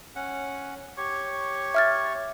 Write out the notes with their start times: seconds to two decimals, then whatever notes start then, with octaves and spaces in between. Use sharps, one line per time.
0.15 C#4 F#5
0.97 G4 C#5 C#6
1.74 E5 F6 A6